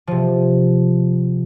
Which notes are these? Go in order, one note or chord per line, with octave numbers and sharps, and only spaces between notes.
C3 F3